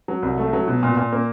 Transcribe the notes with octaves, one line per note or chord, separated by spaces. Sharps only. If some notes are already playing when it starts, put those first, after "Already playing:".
F#3
C2
A3
F#3
B2
A#2
A#2
A#3